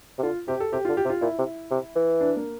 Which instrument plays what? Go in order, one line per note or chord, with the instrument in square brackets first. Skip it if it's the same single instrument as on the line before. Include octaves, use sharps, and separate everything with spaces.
[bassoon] C3
[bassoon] D3 [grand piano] F4
[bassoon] C3 [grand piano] G4
[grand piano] A4
[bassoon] C3 [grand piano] G4
[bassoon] D3 [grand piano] F4
[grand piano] G4
[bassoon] C3
[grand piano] F4
[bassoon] A#2 [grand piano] E4
[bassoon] C3
C3
E3
[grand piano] D4
A#3